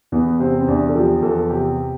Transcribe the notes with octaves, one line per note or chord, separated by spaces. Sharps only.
E2 B3
C3 C4
C4
E2 D4
A4
F3 G4
E2 A4
C3 G4